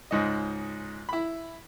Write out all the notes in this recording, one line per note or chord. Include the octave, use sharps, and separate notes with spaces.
C#2 G#2 D#5
E4 B5